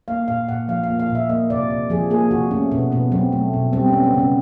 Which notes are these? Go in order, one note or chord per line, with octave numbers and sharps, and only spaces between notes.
A#3 F5
A#2 F5
A#2 F#5
F3 F5
F5
A#3
F5
A#2 E5
A#3 D#5
C3 D5
C3
F3 G#4
A#3 G#4
C3 F#4
A3 C#4
B2 B3
B2 B3
F#3 C4
A3
B2
G3 C4
C#4
B3
B3
C#3 B3